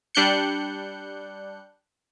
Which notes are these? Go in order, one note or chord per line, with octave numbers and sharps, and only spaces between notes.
G3 D4 F#6 G6 C#7